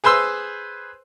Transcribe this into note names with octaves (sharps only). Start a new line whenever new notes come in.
G#4 B4 C5 C6 E6